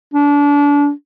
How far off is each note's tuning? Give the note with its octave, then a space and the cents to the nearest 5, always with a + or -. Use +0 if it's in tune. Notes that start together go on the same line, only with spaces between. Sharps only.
D4 -30